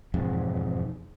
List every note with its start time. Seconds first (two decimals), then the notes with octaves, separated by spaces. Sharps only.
0.14 E1 F2 G#2